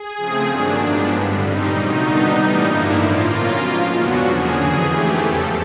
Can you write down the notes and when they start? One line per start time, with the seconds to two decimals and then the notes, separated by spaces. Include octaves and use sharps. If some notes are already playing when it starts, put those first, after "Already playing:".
Already playing: G#4
0.17 C#3 F3 A3 C4
0.49 G2 D#3 F#3 A#3 D4
0.80 A2 F3 G#3 B3 D4
1.11 G2 D3 G3
1.42 A#2 G3 C4 D#4
1.74 C3 D#3 F#3 A3 D#4
2.05 B2 G3 B3 D4
2.37 A2 E3 G3 A#3 D#4
2.69 G2 D3 F3 A#3 D4 E4
2.99 A2 F3 A#3 F4
3.31 B2 F#3 A#3 C#4
3.62 G#2 F3 G#3
3.93 E2 C#3 F#3 B3 D4 F#4
4.25 D3 F3 A#3 C#4 G#4
4.56 F2 C#3 E3
4.87 G#2 E3 A3 G4
5.19 E2 C#3 F3 A4